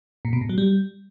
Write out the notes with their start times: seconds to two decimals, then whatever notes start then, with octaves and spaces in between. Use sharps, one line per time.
0.25 A#2
0.33 B2
0.41 A2
0.49 F#3
0.58 G3